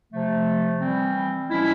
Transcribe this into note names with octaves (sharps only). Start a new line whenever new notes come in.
C3 F3 A3
E3 G3 C4
A#2 F3 G#3 C#4 E4